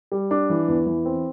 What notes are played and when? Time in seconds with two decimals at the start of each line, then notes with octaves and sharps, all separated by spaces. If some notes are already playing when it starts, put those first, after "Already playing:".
0.12 G3
0.31 D4
0.50 E3
0.68 E2
0.86 E3
1.05 C4